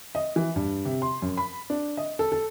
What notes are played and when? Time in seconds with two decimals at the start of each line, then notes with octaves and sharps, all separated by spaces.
0.15 D#5
0.36 E3
0.56 G2
0.85 C3
1.02 C6
1.22 F#2
1.37 B5
1.70 D4
1.97 D#5
2.19 A4
2.32 A4